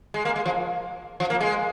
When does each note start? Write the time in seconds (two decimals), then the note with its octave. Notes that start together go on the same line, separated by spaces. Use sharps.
0.14 G#3
0.25 A#3
0.36 G#3
0.46 F3
1.20 F3
1.30 A#3
1.41 G#3